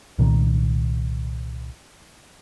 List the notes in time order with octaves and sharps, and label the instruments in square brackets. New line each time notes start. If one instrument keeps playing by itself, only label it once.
[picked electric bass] C2 A#2 D#3